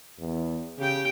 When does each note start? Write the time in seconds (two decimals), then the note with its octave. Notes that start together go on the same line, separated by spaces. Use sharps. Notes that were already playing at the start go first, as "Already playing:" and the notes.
0.19 E2
0.79 C#3 G4 G5